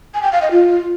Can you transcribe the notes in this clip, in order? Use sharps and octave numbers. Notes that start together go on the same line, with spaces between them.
G#5
G5
F5
D#5
F4